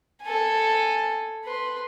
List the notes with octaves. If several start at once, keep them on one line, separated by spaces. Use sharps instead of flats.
A4 G#5
B4 C6